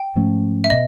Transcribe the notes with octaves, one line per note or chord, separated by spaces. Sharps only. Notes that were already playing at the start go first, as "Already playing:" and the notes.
Already playing: G5
G#2 F3 A3 C#4
E5
B2 D#5